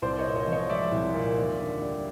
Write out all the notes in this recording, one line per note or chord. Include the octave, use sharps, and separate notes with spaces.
C2 C5 D5
C#5 D#5
A#2
C#5 D#5
F3
C#5 D#5
G#3 D5 E5
C2
A#2
D#2
D3
G3